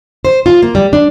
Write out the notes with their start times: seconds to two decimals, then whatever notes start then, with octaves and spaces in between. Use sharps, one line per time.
0.25 C5
0.46 F4
0.62 A#3
0.75 G3
0.93 D4